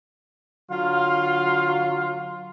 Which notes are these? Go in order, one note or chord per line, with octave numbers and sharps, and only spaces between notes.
D3 F#3 F4 F5 C6